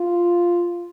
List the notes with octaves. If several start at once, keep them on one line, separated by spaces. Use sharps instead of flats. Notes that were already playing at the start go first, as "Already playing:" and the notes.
Already playing: F4